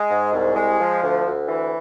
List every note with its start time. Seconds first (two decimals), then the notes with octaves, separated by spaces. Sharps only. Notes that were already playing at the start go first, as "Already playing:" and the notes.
Already playing: G#3
0.10 G#2
0.33 C2
0.56 G#3
0.79 F3
1.03 D2
1.26 D2
1.48 E3